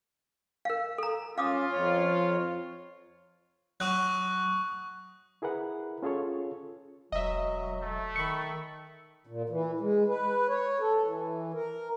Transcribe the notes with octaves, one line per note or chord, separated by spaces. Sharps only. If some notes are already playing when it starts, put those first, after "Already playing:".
A#4 F5
A4 A#5
C#4 F4 F5 D6 D#6
F2 C#5
F#3 F#4 C#6 D#6 F#6
E4 G#4 A#4 B4 F#5
C#4 F4 G#4 A4 C#5
E1 F#3 D#5 E5
A3
D#3 B5 C#6
A#2
E3
G#3
B4
C#5
A4
E3
A#4